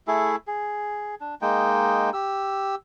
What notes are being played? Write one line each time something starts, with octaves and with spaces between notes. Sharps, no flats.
A3 E4 G#4 A4
G#4
D4
G#3 A#3 D#4 G5
G4 E6